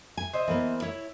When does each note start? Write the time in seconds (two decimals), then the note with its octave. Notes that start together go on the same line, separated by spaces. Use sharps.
0.17 G#5
0.34 C5 D#5 E5
0.48 E3 A#3 B3
0.82 E4 C#5